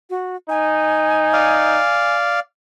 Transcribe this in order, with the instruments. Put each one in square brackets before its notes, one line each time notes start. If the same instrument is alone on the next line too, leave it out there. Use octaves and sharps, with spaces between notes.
[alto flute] F#4
[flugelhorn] D#4 [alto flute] G#5
[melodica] D5 F5